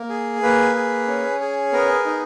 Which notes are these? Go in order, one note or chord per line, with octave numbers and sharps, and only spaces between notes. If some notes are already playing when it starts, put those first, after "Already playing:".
Already playing: A#3
G#4
A#3 B4
G#4
C#4
G#4
B3 A#4
D#4